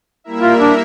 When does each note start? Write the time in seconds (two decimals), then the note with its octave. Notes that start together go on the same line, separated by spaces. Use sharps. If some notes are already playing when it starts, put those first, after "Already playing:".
0.24 G3 A#3 E4 A#4 E5
0.42 F4
0.60 D4